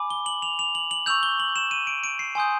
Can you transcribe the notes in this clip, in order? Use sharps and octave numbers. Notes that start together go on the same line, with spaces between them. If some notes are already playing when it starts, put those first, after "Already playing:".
Already playing: G#5 B5 D6
G7
F#7
F7
F7
F#7
F#7
C#6 E6 G6 F7
G7
F#7
E7
D#7
D7
D7
C7
G#5 C6 D#6 G6